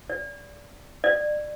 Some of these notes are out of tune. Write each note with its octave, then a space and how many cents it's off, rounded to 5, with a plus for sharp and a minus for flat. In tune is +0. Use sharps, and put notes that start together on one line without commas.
D5 -25
D5 +25